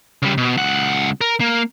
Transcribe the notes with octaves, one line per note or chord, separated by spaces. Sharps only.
C#3 G3
B2
C#2 F#5
A#4
A#3